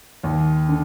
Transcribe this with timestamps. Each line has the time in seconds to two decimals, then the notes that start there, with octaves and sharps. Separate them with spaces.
0.24 D#2
0.69 D3